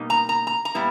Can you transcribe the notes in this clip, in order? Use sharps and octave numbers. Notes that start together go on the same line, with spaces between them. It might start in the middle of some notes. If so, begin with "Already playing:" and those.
Already playing: B2 G3 A#3 D#4
A#5
A#5
A#5
A#5
A#2 G3 B3 E4